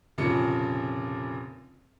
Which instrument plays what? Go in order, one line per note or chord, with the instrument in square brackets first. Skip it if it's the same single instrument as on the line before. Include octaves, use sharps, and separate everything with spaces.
[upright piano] F1 A#2 C#3 F3 C#7